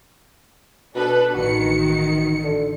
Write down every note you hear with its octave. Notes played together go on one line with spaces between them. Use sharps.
B2 D4 A4 B4
A1 D#3 F#4 C#7
D3